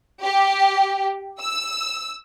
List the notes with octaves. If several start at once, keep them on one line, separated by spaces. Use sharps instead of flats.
G4
E6